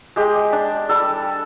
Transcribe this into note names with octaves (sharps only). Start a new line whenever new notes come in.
G#3 G4
D4
G3 A4